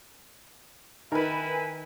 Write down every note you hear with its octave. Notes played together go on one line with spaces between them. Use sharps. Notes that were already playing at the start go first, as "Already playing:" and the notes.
D#3 E4 A#4 B4 G#5